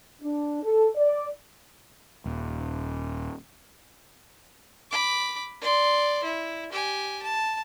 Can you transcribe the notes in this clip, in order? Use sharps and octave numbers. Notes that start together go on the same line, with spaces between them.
D4
A4
D5
D#1
B5 D6
D5 C6
E4
G4 G#5
A5